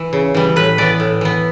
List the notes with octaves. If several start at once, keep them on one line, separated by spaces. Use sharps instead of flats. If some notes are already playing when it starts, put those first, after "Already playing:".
Already playing: E3
C#3
E3 G3
A2 B4
E3 B3 D5
A2
E3 B3